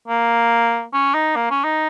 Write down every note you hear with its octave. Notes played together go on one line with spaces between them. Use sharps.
A#3
C#4
D#4
A#3
C#4
D#4